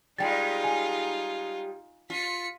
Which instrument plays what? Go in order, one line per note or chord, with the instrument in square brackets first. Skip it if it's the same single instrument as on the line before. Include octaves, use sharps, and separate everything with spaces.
[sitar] G3 G#3 [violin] D#4 F4 [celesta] G5 A6
[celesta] G#5
[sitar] F4 [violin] B6 C#7